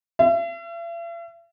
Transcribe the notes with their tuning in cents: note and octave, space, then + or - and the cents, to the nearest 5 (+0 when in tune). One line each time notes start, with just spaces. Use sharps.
E5 +45